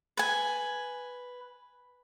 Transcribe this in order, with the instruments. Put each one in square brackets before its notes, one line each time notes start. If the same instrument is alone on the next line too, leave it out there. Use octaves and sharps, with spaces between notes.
[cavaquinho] B4 G#5